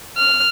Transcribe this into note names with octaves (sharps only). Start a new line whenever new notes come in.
F6